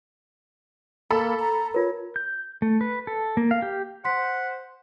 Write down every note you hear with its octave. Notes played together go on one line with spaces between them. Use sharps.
A#3 A4 B5 E6
A#5
F4 A#4 C#5
G6
A3
B4
A4
A#3
F5
G4
C5 F#5 C6 B6